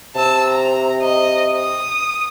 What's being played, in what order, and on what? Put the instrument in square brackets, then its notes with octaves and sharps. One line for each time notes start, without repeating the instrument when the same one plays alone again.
[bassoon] C3 [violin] A5 E6
[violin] A#5
D#5
D#6